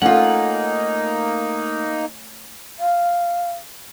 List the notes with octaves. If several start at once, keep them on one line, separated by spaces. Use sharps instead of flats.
A3 A#3 C#4 D#4 F4 F#5
F5